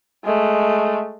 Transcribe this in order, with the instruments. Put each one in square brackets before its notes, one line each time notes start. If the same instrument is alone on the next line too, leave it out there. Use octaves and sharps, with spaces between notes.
[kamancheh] G#3 A3